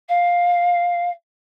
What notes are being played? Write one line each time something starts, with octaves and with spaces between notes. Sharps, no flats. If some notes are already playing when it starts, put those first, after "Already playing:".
F5